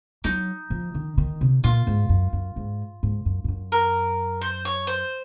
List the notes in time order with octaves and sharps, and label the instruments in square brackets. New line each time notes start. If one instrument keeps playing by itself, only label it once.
[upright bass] F#3 [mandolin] D#4
[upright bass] F3
D#3
D#3
C3
[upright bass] A#2 [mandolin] F4
[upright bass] G#2
F#2
F#2
G#2
G#2
F#2
G#2
F#2
[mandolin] A#4
C5
C#5
C5